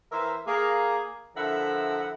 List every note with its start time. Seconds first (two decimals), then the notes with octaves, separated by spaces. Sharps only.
0.12 E3 A#4 C5 E5
0.47 A#3 G#4
1.36 D3 F3 E4 A#4 E5 F#5